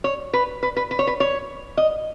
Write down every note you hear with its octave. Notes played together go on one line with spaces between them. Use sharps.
C#5
B4
B4
B4
B4
C#5
B4
C#5
D#5